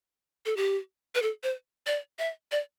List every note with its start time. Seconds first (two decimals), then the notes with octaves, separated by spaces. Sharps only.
0.46 A4
0.57 G4
1.15 B4
1.22 A4
1.43 C5
1.87 D5
2.19 E5
2.52 D5